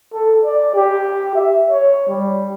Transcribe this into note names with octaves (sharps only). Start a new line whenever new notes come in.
A4
D5
G4
E5
C#5
G3